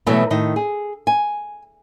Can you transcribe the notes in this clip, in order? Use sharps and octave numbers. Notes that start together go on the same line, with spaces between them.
B2 E3 F#3 G3 A3 B3
A2 D#3 D#5
G#4
G#5